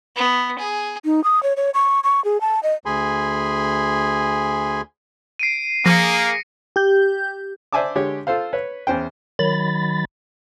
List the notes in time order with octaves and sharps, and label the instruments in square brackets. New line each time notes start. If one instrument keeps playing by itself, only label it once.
[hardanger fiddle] B3
G#4
[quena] D#4
D#6
C#5
C#5
C#6
C#6
G#4
A5
D#5
[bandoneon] D2 G#4 G#5 B5 C6
[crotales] C7 D7 D#7
[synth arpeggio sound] F3 [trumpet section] A#3 G#4 [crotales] A#6 C#7
[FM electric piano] G4 G6
[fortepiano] C5 D5 E5 G#5 A5 D6
D3 G#3 G4 C#5
F4 A4 C5 F5
B4 C#5
E2 C#4 C5 G5
[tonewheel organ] D#3 F#3 B5 A6